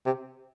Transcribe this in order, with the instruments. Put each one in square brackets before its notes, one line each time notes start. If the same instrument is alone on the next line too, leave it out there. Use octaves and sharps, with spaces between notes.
[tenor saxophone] C3